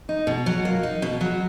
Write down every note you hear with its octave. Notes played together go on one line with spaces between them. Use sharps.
D#4
B2
F#3
A#3
D#4
B2
F#3